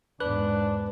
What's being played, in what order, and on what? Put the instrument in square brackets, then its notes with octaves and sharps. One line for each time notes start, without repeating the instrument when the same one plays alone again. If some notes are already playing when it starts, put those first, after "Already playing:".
[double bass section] E2 G#2 [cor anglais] D4 [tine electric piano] B4 F#6